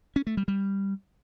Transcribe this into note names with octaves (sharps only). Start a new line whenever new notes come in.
C#4
A3
G3
G3